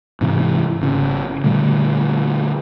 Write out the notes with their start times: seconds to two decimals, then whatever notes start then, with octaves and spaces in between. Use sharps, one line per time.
0.21 G#2 C3 E3
0.81 G#1 C#3
1.44 A#2 D3 G3 A3